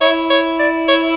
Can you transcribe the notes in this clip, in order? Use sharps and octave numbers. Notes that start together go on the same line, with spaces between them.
E4 C#5
C#5
D5
C#5